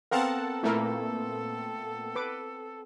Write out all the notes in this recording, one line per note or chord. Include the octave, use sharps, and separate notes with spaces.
B3 C4 A4 A#4 F5 F#5 A5 A#5
A#2 A3 A#3 E4 A#4
B4 D6